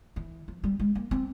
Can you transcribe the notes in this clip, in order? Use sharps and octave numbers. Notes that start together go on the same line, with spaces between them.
E3
F3
G3
G#3
A#3
C4